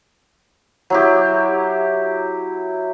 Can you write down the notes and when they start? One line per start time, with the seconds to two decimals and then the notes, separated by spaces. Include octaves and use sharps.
0.90 F#3 E4 G4